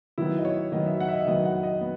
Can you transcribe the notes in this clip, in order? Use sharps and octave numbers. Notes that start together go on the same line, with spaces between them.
D#3 F#3 B3 E4
D#5
C#5
D#3 F#3 B3 D#5
E5
F#5
E5
D#5
D#3 F#3 B3 D#5
F#5
D#5
B3